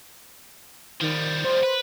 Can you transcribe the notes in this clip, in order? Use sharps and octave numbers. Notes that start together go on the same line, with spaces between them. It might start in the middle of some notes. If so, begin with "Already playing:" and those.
D#3 F3 G3
C5
B4